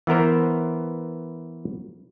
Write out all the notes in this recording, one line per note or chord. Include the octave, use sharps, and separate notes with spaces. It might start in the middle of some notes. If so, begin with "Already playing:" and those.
E3 B3 A#4 C5